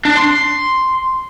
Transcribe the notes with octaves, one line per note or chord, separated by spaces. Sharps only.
D4
C6